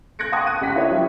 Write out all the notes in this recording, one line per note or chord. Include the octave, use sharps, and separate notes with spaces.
F#6 G#6 A#6 C#7 D7
F#5 G5 A5 C6 C#6 D#6
D#7
C#2 G4 F#5 B6
E4 C#5
F3 G3